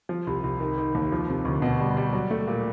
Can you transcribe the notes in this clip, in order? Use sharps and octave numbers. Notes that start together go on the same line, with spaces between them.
F3
C2
C2
D#3
D#3
D#2
F3
C3
D2
B2
G3
G3
F#3
A3
A#2